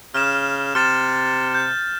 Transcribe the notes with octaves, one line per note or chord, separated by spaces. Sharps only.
C#3 F6 E7
C3 F6 A6 E7
G6